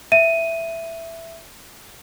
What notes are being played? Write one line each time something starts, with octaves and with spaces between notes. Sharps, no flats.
E5 D#7